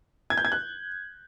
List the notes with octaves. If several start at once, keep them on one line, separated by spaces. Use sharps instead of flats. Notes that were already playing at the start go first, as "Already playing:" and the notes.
G#6
G6
G#6
F#6